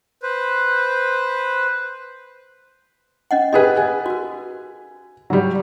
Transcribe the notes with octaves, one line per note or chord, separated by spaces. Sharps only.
B4 C5
C#4 D#5 F#5
G4 G#4 A#4 B4 D#5
G#5
F#4 A#4
F#3 G3